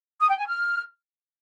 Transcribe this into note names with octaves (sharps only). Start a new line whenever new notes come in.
D#6
G5
G#5
F6